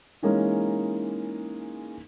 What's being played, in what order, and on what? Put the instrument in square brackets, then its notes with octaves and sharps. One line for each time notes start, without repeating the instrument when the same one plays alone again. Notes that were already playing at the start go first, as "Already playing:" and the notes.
[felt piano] E3 G#3 A#3 C#4 D#4